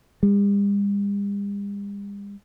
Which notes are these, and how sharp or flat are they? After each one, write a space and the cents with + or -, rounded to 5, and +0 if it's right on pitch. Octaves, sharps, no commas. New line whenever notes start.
G3 +45